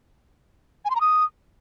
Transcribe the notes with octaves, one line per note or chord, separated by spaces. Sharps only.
G#5
C6
A#5
D#6